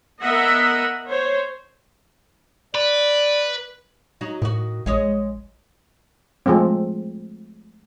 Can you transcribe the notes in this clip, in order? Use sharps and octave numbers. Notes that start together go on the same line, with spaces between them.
B3 A#4 D#5 E5 F#5
C5 C#5
B4 D5
F#3 D#4 F#4
A2 D#3 F#4
A#1 G#3 C#5 D#5
F3 G#3 A3 C4